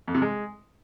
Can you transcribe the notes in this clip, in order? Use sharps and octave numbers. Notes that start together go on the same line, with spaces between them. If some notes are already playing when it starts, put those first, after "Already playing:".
F2
C3
G#3